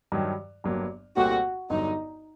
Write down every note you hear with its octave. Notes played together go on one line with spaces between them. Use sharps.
G2 D#3 F#3
G1 G2 F#3 A#3
C2 A#2 A3 C4 F#4 G4
G1 G2 D3 F#3 D#4